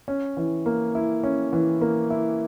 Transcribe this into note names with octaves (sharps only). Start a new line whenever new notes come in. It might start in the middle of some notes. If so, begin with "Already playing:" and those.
C#4
E3
A#3
E4
C#4
E3
A#3
E4